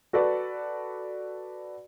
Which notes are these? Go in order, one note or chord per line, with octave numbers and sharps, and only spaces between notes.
F#4 A4 B4 D5